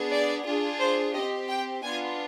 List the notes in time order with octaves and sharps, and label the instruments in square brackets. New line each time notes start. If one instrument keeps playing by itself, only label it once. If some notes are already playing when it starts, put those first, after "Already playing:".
Already playing: [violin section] B3 D4 G#4
D5
D4 F4 G#4
C5
C4 G4 D#5
G5
B3 D4 F4 G#5